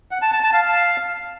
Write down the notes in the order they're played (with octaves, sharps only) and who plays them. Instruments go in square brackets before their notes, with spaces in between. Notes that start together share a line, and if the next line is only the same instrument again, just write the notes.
[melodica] F#5
A5
A5
A5
F5